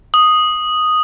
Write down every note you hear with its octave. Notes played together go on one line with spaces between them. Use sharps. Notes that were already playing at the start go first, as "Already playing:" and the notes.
D#6